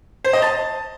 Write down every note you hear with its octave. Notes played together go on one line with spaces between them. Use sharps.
C5
D#5
A5